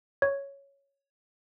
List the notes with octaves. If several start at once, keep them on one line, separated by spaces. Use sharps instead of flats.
C#5